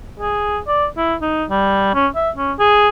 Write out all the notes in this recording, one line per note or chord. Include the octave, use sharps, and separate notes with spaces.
G#4
D5
E4
D#4
G3
C#4
E5
C#4
G#4